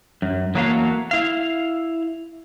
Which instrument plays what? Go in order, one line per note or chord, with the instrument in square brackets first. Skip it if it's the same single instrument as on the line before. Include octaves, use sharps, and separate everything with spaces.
[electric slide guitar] F#2
E2 F#3 A3 A#3 C#5 F5
E4 F5